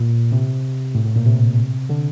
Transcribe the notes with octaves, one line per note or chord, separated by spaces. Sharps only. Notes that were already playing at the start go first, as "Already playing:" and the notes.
Already playing: A#2
C3
A2
A2
A#2
C3
D3